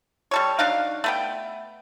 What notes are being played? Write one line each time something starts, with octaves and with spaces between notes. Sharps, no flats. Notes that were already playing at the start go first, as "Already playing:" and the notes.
G3 A4 C#5
F#3 D4 D#4 F5
A3 B3 G5